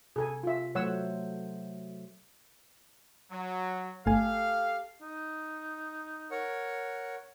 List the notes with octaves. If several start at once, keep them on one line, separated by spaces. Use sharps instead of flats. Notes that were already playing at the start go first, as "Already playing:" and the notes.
C3 G#4 A4 G#5
F4 E5
F#3 A3 C5 C#5 F#5 E6
F#3
G1 A3 G4 A4 F5 G#5
D#4
A#4 C#5 F#5